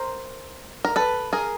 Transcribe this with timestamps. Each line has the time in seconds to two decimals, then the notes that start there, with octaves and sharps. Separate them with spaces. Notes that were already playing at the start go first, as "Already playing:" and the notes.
Already playing: A#4 C5
0.85 A#4
0.96 A4 B4
1.33 G#4 A#4